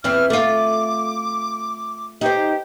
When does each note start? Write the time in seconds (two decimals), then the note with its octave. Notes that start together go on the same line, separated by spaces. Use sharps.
0.04 E2 E3 C4 F6
0.30 A3 F4 D6
2.21 D#4 G4 C5